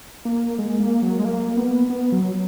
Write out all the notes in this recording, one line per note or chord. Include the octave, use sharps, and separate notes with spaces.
A#3
G#3
A#3
F#3
G#3
A#3
B3
B3
F#3